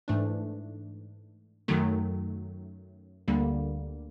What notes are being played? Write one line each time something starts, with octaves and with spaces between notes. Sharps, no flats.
G#2 E3 A3 D4
F#2 D#3 F#3 A3
D2 D3 G3 A#3